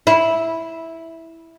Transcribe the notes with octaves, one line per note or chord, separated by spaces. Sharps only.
E4